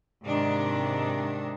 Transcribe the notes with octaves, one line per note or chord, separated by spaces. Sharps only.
G#2 C3 D#3 D4